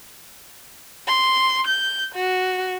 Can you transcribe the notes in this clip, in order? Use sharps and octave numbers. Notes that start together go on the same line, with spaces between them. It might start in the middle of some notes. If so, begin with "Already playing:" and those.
C6
G6
F#4